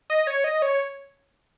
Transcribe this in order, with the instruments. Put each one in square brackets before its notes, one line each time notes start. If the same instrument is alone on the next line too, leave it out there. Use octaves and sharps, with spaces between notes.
[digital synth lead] D#5
C#5
D#5
C#5